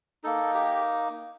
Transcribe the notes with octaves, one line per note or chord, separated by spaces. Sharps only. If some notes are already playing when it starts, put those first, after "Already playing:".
A#3 D#4 A4
G4